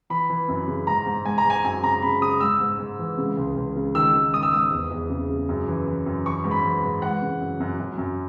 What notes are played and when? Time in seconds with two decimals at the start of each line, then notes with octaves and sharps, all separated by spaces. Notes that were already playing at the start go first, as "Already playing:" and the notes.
0.10 E3 B5
0.30 E3
0.48 F#2
0.68 C#3
0.87 G#2 A#5
1.06 G#2
1.25 G#2 G#5
1.38 A#5
1.45 G#2 G#5
1.64 F#2 G#5
1.83 C#3 A#5
2.02 C#3 B5
2.22 C#3 D#6
2.40 G#2 E6
2.60 G#2
2.79 G#2
2.99 E3
3.18 C#3
3.37 C#2
3.56 C#2
3.76 C#3
3.95 D#3 E6
4.14 D#3
4.33 G#2 D#6
4.43 E6
4.53 G#2 D#6
4.72 E2
4.91 E2
5.10 C#3
5.29 C#3
5.49 F#2
5.68 E3
5.87 E3
6.06 F#2
6.26 E3 C#6
6.44 G#2
6.51 B5
6.64 E3
6.83 G#2
7.02 E3 F#5
7.22 C#3
7.41 F#2
7.60 F#2
7.79 F#2
7.98 F#2